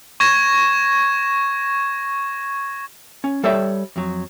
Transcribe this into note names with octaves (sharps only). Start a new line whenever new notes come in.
C#6 G#6 A#6 E7
C#4
G3 A4 C#5 D5 E5 G5
F2 F#3